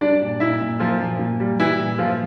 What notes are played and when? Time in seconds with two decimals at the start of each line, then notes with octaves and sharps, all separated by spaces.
0.01 G3 D4 D5
0.22 A#2
0.40 A#2 E4 E5
0.61 A#2
0.80 F3 A#3 F4
1.00 A#2
1.19 A#2
1.40 G3
1.59 E3 G3 E4
1.79 A#2
1.98 A#2 F3 F4